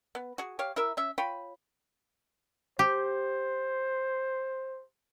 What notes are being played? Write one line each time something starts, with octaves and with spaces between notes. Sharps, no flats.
B3
F#4 G#4
G4 C#5 F5
E4 A#4 E5
C#4 E5
F4 C#5 G5 B5
G4 C5